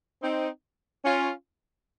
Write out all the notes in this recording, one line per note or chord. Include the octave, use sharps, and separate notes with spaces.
C4 D#4
C#4 F4